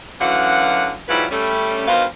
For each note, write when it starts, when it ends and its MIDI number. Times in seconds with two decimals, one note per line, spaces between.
0.21 0.96 42
0.21 0.96 50
0.21 0.96 52
0.21 0.96 54
0.21 0.96 77
0.21 0.96 78
1.08 1.25 44
1.08 1.25 54
1.08 1.25 55
1.08 1.25 64
1.08 1.25 65
1.08 1.25 71
1.31 1.87 55
1.31 1.87 57
1.31 1.87 61
1.88 2.05 43
1.88 2.05 47
1.88 2.05 51
1.88 2.05 72
1.88 2.05 77